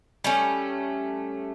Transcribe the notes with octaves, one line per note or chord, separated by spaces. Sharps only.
G3 A3 C#4